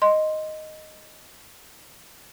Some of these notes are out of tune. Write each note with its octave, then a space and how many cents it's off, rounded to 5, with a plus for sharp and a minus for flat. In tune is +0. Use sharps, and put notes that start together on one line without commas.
D#5 +0 C6 +0